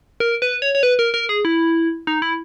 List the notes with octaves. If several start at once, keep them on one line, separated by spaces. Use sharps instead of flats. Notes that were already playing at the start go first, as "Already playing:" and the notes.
A#4
B4
C#5
C#5
B4
A#4
A#4
G#4
E4
D#4
E4